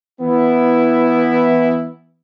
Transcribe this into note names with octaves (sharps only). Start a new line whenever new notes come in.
E3 B3 E4